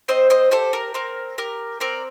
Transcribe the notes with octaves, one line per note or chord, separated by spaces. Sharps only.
C4 C5 D#5
C5 D#5
G4 A4 C5
A#4
C4 A#4
G4 A#4
C4 A#4 D5